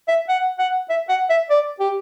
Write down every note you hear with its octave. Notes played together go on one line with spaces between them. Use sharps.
E5
F#5
F#5
E5
F#5
E5
D5
G4